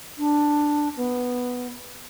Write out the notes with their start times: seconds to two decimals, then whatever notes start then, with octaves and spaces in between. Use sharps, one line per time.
0.18 D4
0.97 B3